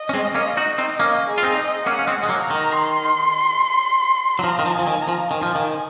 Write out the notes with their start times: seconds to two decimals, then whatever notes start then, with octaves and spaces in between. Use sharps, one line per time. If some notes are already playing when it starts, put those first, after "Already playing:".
Already playing: D#5
0.09 C#4
0.14 G#3 C4
0.34 A#3 C#4
0.57 D#4 F#4
0.78 C4 D#4
1.00 A#3 C#4 D#5
1.29 G#4
1.38 F4
1.43 C4 D#4
1.57 D#5
1.86 A#3 C#4 F#5
1.99 C#4
2.07 G#3 C4
2.14 F#5
2.23 G#3
2.29 F#3 A#3
2.43 A#5
2.50 D#3
2.72 C6
4.39 F#3
4.44 F3 A#5
4.59 D#3
4.66 F3
4.73 G#5
4.79 F3
4.87 D#3
5.02 A#5
5.08 F3
5.30 D#3 G#5
5.43 F3
5.55 D#3